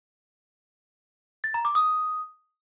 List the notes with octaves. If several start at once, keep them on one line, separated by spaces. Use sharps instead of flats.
A6
A#5
D6
D#6